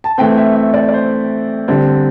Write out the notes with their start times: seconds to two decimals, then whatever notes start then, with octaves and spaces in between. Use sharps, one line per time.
0.04 A5
0.18 E3 A3 C4 G5
0.37 E5
0.55 E5
0.74 D5
0.89 D5
0.94 C5
1.68 D3 G3 C4